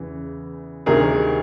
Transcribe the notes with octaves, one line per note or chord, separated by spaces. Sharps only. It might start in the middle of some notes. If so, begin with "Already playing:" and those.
Already playing: E2 C#3 E3
D2 C3 D#3 G3 G#4 A#4